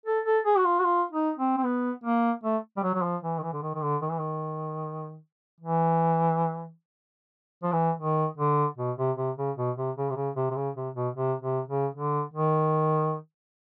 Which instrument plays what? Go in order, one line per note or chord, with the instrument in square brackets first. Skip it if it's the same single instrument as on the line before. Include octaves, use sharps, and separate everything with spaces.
[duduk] A4
A4
G#4
F#4
F4
F#4
F4
D#4
C4
C4
B3
A#3
A3
G3
F#3
F#3
F3
E3
D#3
E3
D3
D#3
D#3
D3
D#3
E3
D#3
E3
F3
E3
D#3
D3
B2
C3
C3
C#3
B2
C3
C#3
C3
C#3
C3
C3
C#3
C3
B2
C3
C3
C#3
D3
D#3